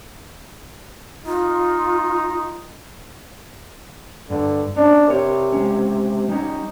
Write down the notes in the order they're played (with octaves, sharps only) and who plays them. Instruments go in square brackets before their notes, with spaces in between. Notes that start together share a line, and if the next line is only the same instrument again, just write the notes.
[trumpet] D#4 [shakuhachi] F4
[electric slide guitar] G2 [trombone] D3
[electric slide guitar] C#4 [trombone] D4
[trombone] C3 [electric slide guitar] A#4 C#5
[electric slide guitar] G#3 C#4
[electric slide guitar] G3 C#4 [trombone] D#4